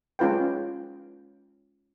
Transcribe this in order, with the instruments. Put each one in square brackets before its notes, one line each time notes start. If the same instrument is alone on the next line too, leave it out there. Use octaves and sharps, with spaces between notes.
[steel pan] G#3 C#4 F4 B4 G5